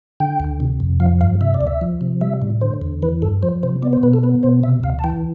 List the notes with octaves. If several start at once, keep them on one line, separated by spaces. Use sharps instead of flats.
D3 G5
D2
C3
F2
F3 F5
G2 F5
C3 E5
D5
D2
E5
F3
C3
G3 E5
A2
D3 C5
E2
E3 B4
G2 A4
F3 C5
C3 C5
B3 D5
C5
B2 B4
A4
B3 B4
B2 C5
C3 E5
D2 F5
A5
E3 G5